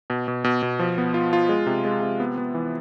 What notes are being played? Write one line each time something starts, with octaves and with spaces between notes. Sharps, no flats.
B2
B2
B2
B2
F3
B3
F4
F4
G#3
C3
G#3
C3
B3
B3
E3